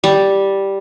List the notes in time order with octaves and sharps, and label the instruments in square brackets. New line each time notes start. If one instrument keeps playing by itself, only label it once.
[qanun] G3